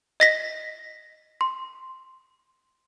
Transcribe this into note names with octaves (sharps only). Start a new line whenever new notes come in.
D#5 A#6 B6
C6